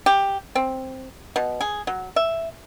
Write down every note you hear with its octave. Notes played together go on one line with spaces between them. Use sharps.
G4
C4
B2
G#4
F#3
E5